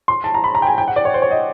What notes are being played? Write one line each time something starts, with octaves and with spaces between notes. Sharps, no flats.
C6
A5
A#5
B5
A#5
G5
G#5
G5
F#5
D5
C#5
C5
C#5
D#5